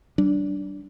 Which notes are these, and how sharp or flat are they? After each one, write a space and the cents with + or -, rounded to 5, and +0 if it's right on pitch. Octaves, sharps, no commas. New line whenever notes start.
G3 -30 D4 -5